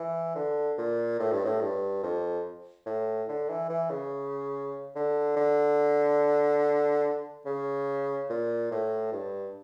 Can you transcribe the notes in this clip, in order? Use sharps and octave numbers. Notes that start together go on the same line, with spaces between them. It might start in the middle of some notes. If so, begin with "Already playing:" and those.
Already playing: E3
D3
A#2
A2
G2
A2
G2
F2
A2
D3
E3
E3
C#3
D3
D3
C#3
A#2
A2
G2